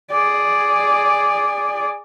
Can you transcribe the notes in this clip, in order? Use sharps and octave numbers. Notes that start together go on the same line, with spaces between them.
G#4 D5